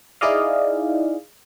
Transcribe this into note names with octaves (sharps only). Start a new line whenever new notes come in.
D#4 E4 G#4 D5 D#5 F5